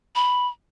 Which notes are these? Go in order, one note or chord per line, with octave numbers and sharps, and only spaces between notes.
B5